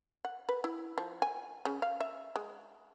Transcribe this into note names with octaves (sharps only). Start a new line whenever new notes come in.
F#5
B4
E4
F3
G#5
C#3
F5
E5
G#3